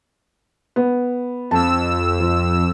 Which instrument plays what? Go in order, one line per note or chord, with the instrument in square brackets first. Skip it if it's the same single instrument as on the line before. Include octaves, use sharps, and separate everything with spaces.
[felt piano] B3
[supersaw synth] F2 E6 [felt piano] A5
[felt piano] F3